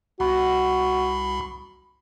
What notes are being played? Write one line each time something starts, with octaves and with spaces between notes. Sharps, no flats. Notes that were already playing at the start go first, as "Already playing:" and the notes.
C2 F#4 B5